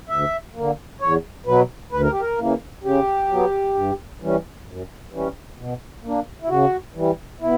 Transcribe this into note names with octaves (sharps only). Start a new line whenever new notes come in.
D2 E5
D3 A#3
E2 C#5
B2 F#3 B4
D2 B4
A#4
G4
A#4
C#3 E3 A#3
C#3 G4
F#3 B3
G2
E3 G3 C#4
F#2
E3 G3 C#4
B2
A#3 D4
E4
C#3 F#4
E3 G3
B2 E4